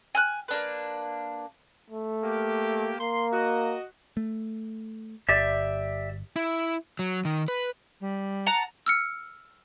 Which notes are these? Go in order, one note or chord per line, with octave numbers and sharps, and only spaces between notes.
G#5 F6 F#6
A#3 D4 B4
A3
A#3 G4
A#3 C6
F#4 D#5
A3
G1 G4 D5 E5
E4
F#3
D#3
B4
G3
F#5 A5 A#5
E6 F6 C#7